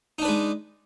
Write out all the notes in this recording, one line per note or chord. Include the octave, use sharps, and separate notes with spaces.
G#3 D4 D#4 B4